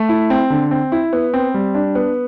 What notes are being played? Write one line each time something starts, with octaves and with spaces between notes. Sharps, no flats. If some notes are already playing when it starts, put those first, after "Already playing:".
Already playing: A3
E4
C4
D3
C4
E4
B3
C4
G3
D4
B3